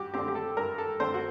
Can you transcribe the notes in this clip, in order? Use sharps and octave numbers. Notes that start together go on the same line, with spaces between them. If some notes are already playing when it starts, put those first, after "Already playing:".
Already playing: G2 F#4 G4
D3 A3 C4 G4
G4
A4
G2 A#4
A4
D3 A3 C4 C5
F#4